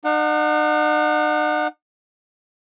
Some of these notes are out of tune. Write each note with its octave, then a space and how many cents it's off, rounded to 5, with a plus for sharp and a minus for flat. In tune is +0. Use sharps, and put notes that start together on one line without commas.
D#4 -45 F#5 -25